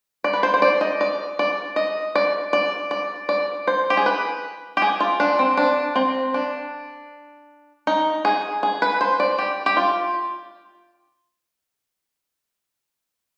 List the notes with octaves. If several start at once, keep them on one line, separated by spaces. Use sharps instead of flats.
D5
B4
C5
C5
D5
D#5
D5
D5
D#5
D5
D5
D5
D5
C5
G4
G#4
B4
G4
G#4
F4
D4
C4
D4
C4
D4
D#4
G#4
G#4
B4
C5
D5
G4
G4
F4